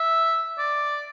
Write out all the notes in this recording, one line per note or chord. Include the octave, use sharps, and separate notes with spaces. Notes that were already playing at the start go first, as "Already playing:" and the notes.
Already playing: E5
D5